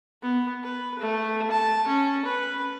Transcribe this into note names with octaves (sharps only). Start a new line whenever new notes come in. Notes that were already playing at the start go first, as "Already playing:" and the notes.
B3
B4
A3
A5
C#4
B4